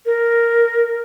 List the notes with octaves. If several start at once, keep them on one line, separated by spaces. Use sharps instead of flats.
A#4